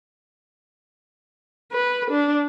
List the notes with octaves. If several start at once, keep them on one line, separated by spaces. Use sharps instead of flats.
B4
D4